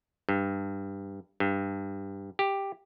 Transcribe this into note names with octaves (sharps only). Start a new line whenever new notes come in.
G2
G2
G4